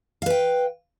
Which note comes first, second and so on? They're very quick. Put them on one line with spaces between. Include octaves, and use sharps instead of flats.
F5 B4 G5